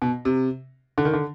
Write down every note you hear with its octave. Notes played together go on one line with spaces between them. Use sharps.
B2
C3
D3
D#3
D3